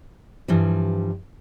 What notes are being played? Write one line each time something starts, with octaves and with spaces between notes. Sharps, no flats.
G2 E3 F3 G3